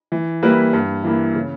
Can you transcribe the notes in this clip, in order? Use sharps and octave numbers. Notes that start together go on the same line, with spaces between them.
E3
G3 A#3 E4 B4
G2
E3 A#3 E4
C#3